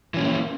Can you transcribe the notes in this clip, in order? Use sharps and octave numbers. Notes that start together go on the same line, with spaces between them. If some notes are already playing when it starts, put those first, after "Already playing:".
E3 A#3 C#4